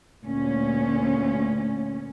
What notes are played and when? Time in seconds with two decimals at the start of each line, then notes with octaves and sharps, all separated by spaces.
0.23 D2 A#2 C#4